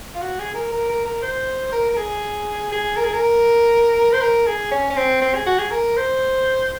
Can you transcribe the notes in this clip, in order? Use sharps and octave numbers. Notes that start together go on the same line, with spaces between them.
F4
F#4
G#4
A#4
A#4
A#4
A#4
C5
A#4
A#4
G#4
G#4
A#4
G#4
A#4
C5
A#4
G#4
C#4
C#4
C4
C4
G#4
F#4
G#4
A#4
C5